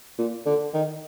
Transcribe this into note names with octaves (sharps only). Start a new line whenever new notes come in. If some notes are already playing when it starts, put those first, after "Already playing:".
A#2
D3
D#3